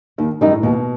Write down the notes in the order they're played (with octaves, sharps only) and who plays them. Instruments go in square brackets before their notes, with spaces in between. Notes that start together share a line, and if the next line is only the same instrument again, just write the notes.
[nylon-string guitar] D#2 [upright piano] D#3
[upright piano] F#2 [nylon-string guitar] D#3 G3 D#4
[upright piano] A2
[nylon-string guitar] D#2 [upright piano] B2